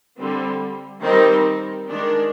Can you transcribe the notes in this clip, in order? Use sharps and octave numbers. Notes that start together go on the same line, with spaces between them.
D3 G3 C4
D#3 G3 C4 D#4 A#4
D#3 G#3 D4